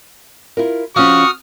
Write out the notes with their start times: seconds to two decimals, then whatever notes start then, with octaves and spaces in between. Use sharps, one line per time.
0.57 E4 F4 A#4
0.96 F3 C#4 F#4 C#6 D#6 F6